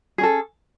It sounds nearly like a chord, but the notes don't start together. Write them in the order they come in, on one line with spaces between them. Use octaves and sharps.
G#4 C#4 A4